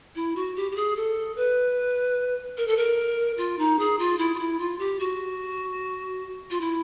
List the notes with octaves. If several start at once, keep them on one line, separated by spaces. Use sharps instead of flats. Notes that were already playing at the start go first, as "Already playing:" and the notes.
E4
F#4
G4
G4
G#4
A4
B4
A#4
A4
A#4
F4
D#4
G#4
F4
E4
F4
E4
F4
G4
F#4
F4
E4